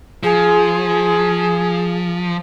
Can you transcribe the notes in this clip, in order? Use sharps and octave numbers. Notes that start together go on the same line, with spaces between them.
F3 G#4